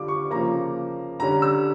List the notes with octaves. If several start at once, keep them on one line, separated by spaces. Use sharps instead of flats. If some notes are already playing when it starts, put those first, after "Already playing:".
Already playing: D3 G3 D4 F4 D6
C#6
C#3 F3 A#3 A#5
D3 G3 C#4 A#5
E6